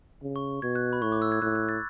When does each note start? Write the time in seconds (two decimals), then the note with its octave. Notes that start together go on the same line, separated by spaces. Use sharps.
0.23 C#3
0.36 C#6
0.62 B2 G#6
0.75 F#6
0.93 B5
1.02 A2 C#6
1.12 D6
1.22 E6
1.32 G#6
1.42 A2 F#6
1.55 F#6
1.69 A6